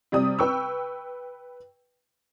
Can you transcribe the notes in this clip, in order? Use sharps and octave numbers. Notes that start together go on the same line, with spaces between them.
C3 G3 D5 D#6
B4 G5 C#6 E6